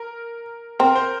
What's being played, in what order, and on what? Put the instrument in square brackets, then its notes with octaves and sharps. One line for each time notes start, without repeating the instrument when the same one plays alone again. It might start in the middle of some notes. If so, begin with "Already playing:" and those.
Already playing: [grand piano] A#4
[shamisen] C4 [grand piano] A#4
[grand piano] C5